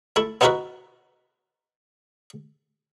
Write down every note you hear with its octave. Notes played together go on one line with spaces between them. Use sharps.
A3 E4
B3 D#4 E4 F#4 A#4 B4